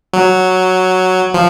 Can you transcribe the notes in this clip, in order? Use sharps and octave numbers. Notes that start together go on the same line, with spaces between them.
F#3
F3